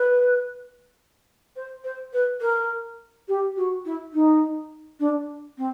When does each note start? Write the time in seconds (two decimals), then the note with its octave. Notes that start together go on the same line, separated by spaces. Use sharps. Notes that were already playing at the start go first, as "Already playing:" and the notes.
Already playing: B4
1.56 C5
1.84 C5
2.13 B4
2.41 A#4
3.28 G4
3.56 F#4
3.85 E4
4.13 D#4
4.99 D4
5.57 C4